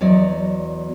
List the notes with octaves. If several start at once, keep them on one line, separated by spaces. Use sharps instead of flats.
E2 F#3 D5 D#5